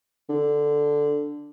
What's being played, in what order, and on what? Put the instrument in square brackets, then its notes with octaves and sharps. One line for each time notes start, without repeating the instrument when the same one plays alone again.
[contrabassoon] D3